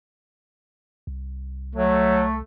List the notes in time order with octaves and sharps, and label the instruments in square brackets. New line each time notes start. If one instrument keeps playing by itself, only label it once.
[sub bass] C2
[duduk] F#3 [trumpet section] A3